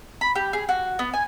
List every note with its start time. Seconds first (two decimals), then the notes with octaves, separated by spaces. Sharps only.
0.21 B5
0.35 G4
0.53 G#4
0.69 F#4
0.99 B3
1.14 G#5